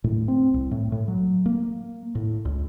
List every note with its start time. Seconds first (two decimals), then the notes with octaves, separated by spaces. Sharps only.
0.04 A2
0.28 C4
0.54 C2
0.71 A2
0.92 A2
1.08 F#3
1.46 A#3
2.15 A2
2.45 C#2